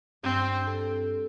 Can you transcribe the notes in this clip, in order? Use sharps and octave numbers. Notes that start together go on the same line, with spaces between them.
G2 C4
A4